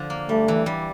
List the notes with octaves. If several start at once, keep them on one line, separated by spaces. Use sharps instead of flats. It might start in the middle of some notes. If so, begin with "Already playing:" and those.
Already playing: D3 F3
A#3
G3 A3
E3
G3